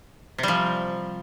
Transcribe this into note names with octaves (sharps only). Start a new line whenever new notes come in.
C3 F3 G3